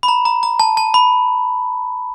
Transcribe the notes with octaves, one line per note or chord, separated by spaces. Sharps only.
B5
A#5
A#5
A#5
A5
A5
B5